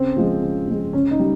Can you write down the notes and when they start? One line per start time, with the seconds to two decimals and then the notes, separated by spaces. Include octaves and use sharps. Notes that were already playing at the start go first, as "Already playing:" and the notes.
Already playing: C#3 C4
0.17 F3 G#3
0.42 C#3
0.68 F3 G#3
0.93 C#3 C#4
1.11 D#4
1.20 G3